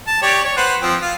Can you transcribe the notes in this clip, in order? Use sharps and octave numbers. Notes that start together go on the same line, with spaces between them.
A5
G4 C#5 D5
C#5
B4 C5 F#5
F3 C4
F4